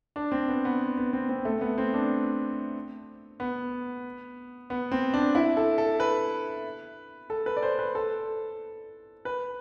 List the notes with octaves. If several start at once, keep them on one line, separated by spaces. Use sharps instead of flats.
D4
C4
B3
B3
B3
C4
C4
A3
B3
C4
D4
B3
B3
C4
D4
E4
A4
A4
B4
A4
B4
D5
C5
B4
A4
B4